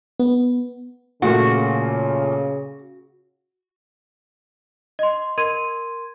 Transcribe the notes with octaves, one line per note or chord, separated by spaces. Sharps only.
B3
A#2 C#3 A3 A#3 F#4
D#5 C6
A#4 C6 G#6 D#7